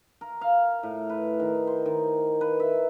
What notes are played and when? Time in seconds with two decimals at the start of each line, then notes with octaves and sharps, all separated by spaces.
0.21 A#4
0.41 F5
0.83 A2
1.09 B4
1.40 D#3
1.67 C5
1.86 D#3
2.41 B4
2.60 E5